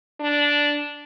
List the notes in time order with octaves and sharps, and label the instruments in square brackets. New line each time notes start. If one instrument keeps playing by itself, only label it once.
[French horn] D4